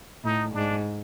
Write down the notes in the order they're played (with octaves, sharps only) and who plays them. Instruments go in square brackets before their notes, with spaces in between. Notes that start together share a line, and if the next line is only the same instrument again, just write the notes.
[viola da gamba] A2 [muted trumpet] D#4
[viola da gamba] G#2 [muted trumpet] D4